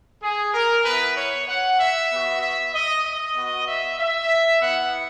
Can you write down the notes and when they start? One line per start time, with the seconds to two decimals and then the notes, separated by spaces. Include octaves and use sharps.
0.23 G#4
0.54 A#4
0.85 B3 E4 B4
1.17 C#5
1.49 F#5
1.80 E5
2.11 B3 F#4
2.42 E5
2.74 D#5
3.05 D#5
3.36 B3 F#4
3.68 E5
4.00 E5
4.61 B3 E4 F#5